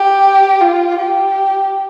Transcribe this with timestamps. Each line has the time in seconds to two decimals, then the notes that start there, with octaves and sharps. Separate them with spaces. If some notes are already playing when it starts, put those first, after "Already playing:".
Already playing: G4
0.60 F4
0.99 G4